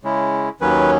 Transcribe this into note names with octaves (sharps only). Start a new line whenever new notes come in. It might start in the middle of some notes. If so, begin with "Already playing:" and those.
C#3 G#3 C#4 E4
D#2 D#3 F#3 C#4 B4